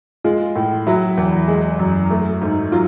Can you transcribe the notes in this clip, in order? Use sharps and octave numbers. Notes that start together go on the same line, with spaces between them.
G#3 F4
A2
F#3 E4
E2
G#3
F#2
A3
G#2
F#3 F4